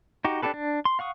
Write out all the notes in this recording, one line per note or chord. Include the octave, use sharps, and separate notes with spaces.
D#4 F#4 G4
D4 E4 G4 A4 B4
D4
C6
F5 F#5 C#6 D#6